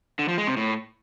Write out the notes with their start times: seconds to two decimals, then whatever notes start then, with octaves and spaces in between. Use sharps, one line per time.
0.19 D3
0.28 F3
0.38 G#3
0.47 C3
0.57 A2